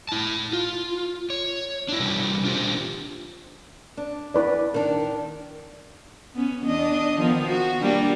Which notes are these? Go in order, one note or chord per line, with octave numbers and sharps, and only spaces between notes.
E4 A5
F4
C#5
D4 E4
C3 G3 F#4 B4
D4 F4 G4 C5
D4
E4 B4 D5
D#3 D4 A#4
B3 C#4
E2 D4 D#5
D#3 F3 B3
F#4
G3 A#3 D4